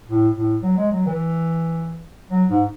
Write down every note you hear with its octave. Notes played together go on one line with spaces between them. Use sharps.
A2
A2
F#3
G#3
F#3
E3
F#3
G#2